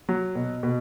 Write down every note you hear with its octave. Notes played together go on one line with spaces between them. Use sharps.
F#3
B2
B2